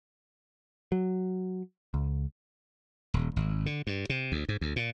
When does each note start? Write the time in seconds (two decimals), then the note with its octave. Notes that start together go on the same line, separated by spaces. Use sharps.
0.92 F#3
1.94 C#2
3.14 D#1
3.36 G#1
3.66 D3
3.87 G2
4.09 C3
4.32 D2
4.49 G#2
4.61 D2
4.76 A#2